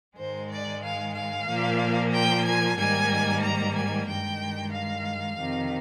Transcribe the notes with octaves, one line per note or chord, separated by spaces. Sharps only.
G#2 D#3 G#3 C5
D5
F5
F5
A#2 F3 A#3
G5
G#5
G#2 D#3 G3 A#3 G#5
A#5
G#5
G2 D#3 G#3 G5
F5
F2 C3 D#3